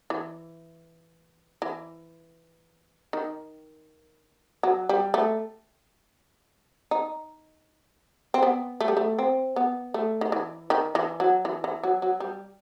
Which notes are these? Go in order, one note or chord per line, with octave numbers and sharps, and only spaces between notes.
E3
E3
D#3
F#3
G3
A3
D#4
C4
B3
A3
G3
A3
C4
B3
A3
D#3
E3
D#3
E3
F#3
E3
E3
F#3
F#3
G3